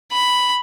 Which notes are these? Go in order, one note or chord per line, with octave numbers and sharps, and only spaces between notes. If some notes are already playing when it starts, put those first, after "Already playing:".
B5